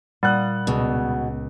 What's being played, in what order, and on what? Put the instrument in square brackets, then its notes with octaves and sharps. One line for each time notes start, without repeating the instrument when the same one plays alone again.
[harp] A#2 D#6 [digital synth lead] G3 [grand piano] F#5 F#6
[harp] C#2 D#5 [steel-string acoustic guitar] B2